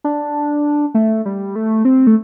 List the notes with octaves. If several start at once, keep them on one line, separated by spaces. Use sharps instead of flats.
D4
A3
G3
A3
C4
A3